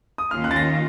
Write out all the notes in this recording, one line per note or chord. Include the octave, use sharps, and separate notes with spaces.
D#6
D#2 D#3 A#3 C#4 F4 F6
F#6
A6
A#6